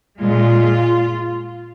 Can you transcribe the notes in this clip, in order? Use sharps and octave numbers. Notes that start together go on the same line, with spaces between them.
A#2 G#3 F4